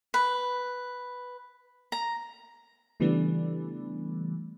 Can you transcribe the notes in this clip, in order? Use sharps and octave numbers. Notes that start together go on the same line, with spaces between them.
B4
A#5
C#3 E3 G3 A3 B3 D4